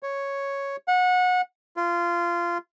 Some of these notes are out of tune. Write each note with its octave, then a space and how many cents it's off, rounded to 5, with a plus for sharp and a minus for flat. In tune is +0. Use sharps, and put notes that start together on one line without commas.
C#5 +0
F#5 -25
F4 -20